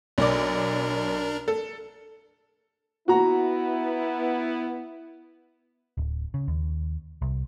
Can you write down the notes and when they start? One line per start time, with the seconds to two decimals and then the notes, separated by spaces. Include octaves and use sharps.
0.18 B1 D4 A#4 D5
1.48 A4
3.08 B3 E4 F#4 A#5
5.98 D1
6.34 C#3
6.48 D#2
7.22 C2